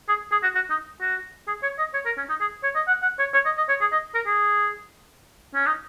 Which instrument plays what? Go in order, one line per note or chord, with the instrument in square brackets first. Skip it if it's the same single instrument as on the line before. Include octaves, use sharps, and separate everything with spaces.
[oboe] G#4
G#4
F#4
F#4
D#4
F#4
G#4
C#5
D#5
C#5
A#4
C#4
D#4
G#4
C#5
D#5
F#5
F#5
C#5
C#5
D#5
D#5
C#5
G#4
D#5
A#4
G#4
C#4
D#4